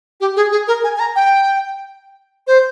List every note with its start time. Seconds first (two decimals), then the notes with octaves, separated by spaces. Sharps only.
0.21 G4
0.36 G#4
0.52 G#4
0.68 A#4
0.84 G#5
0.96 G#5
1.00 A#5
1.16 G5
2.47 C5